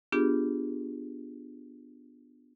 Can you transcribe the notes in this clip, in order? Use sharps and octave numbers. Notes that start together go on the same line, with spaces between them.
B3 D4 F4 G4 G#4